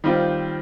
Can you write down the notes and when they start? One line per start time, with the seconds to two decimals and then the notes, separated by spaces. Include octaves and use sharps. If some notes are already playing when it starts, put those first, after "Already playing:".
0.04 D#3 G3 C4 F4